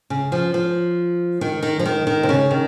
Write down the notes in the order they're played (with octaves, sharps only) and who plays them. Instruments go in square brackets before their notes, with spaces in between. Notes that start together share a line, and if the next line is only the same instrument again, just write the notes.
[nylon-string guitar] C#3
F3
F3
D#3
D#3
F3
D#3
D#3
C3
C#3
D#3